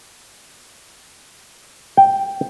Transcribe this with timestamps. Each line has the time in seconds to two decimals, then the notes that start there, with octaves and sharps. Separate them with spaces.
1.97 G5